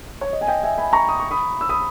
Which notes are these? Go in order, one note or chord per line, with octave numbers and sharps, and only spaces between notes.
C#5
D#5
G#5
D#5 G5
E5 G#5
G#5 B5
A#5 C#6
D#6
C#6
B5 D#6
E6
B5 D#6